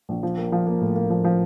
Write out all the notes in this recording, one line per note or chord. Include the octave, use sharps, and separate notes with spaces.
A#1
F3
A#3
F3
A#3
A2
A#3
F3
F3